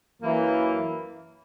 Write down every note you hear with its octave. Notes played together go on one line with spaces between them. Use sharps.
F#2 E3 A#3 E4